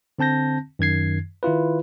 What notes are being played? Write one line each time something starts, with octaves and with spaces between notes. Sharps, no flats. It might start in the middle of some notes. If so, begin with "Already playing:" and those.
D3 C4 A5 G6 A#6
F#2 D#3 G#6 C7
D#3 E4 F4 B4